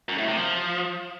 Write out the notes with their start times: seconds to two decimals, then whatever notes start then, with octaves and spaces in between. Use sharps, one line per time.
0.09 F#2
0.18 A2
0.27 C3
0.37 F3